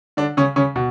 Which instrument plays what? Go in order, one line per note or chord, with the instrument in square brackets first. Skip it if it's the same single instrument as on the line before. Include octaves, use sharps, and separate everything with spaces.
[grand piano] D3 D4
C#3 C#4
C#3 C#4
B2